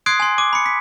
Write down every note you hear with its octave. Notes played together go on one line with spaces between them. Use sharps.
C6 D#6 F#6 G#6 C7 D7
G#5 C6
D6 D#7
B5 C#7
B6